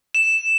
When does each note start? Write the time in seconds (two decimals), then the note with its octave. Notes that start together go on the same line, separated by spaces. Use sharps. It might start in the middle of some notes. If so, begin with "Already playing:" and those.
0.15 E7